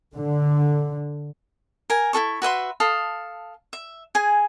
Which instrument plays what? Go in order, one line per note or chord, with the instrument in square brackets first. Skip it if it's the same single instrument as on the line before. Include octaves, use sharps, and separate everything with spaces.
[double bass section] D3
[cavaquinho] A#4 G#5
E4 F#4 A4 C#6
F#4 B4 E5 C6
A4 F5 D#6
E5
G#4 G#5